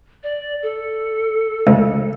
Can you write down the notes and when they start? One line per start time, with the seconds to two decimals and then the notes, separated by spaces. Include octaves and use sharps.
0.23 D5
0.62 A4
1.67 C#2